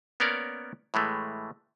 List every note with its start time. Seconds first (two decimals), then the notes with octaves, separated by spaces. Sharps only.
0.20 A#3 B3 C#4 A#4 C#5 D5
0.94 A2 E3 G#3 A3